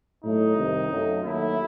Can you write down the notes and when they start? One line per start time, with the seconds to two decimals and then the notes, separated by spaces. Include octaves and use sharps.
0.21 A2 F#3 A3 D#4
0.55 C2 C3 D#3
0.89 F#2 F#3 A3
1.22 D#2 D#3 F#3 A3 E4